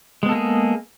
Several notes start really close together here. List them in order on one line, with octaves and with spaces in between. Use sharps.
G#3 B3 A4 A#3 G#4